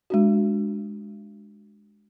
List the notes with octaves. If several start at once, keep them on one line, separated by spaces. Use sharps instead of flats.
G#3 D4 F#4